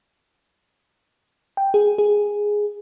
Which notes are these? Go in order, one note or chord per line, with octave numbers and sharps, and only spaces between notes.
G5
G#4
G#4